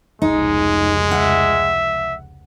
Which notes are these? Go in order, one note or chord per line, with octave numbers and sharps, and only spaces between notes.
F1 C#2 G#3 D#4
E5 F#5